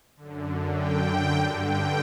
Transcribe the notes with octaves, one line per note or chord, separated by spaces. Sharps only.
F#2 D3
G5
G2 D3
G5